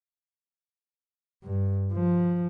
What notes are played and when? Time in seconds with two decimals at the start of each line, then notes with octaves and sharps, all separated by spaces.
1.43 G2
1.93 F3